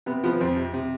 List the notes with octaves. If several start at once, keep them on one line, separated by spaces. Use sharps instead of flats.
C3 B3
F3 B3
F2 C4
C3
C3